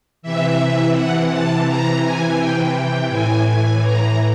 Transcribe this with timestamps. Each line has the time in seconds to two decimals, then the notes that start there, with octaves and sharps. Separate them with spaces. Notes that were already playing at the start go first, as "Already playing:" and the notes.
0.22 C3 E3 E5
0.94 F#5
1.30 A5
1.66 A#5
2.02 G#5
2.37 G5
2.73 G5
3.09 A2 E3 G#5
3.81 A#5